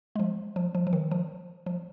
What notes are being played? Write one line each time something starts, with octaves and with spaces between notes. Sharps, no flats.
G#3
F3
F3
F3
F3
D#3
F3
F3